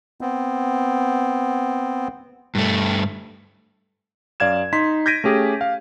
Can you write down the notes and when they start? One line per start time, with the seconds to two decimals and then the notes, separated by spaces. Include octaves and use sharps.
0.21 B3 C4
2.55 G2 A3
4.40 F#2 D5 F5 G#6 E7
4.73 D#4 C6 B6
5.06 G6 G#6 A#6 B6 D7 D#7
5.24 A3 C#4 G4 G#4
5.61 F5